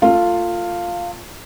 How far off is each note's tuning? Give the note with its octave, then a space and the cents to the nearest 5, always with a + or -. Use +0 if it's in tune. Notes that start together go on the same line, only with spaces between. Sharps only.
A3 +35 F4 +0